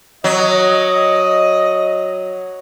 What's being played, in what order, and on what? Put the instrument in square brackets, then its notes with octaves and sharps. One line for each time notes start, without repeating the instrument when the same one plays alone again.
[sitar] F#3 [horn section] D#5